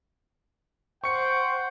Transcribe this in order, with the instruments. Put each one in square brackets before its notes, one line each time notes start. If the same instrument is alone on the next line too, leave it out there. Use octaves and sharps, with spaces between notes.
[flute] C5 [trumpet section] F#5 G5 [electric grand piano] C#6 C#7